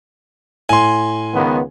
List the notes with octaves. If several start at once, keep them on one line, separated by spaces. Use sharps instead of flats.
A2 G#5 C6
C#2 D#3 B3